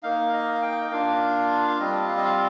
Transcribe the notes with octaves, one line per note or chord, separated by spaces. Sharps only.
A#3 D#4 F5
D#5
F5
G5
D#5
A#3 D4 F4 F5
F5
G3 C4 F4 D#5
F5
D#5
F5